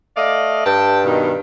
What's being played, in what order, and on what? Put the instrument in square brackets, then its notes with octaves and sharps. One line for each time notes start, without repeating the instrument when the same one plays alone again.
[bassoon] A3 [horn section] D5 D#5 F5
[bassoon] G2 [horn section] G5 A5
[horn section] B2 D#3